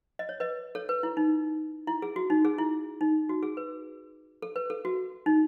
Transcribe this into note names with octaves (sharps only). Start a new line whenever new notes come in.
D#5
C#5
B4 D#5
A4 C#5
B4
E4
D#4
E4
G#4
F#4
D#4
G#4
E4
D#4
F#4
G#4
B4
A4
B4
A4
F#4
D#4